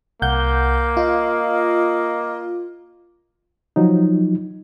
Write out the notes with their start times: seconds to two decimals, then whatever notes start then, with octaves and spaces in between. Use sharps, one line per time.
0.22 C2 A#3 F#5 G6
0.97 F4 D#5
3.76 F3 F#3 D#4